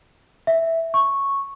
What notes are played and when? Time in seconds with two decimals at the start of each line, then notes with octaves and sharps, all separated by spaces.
0.47 E5
0.94 C#6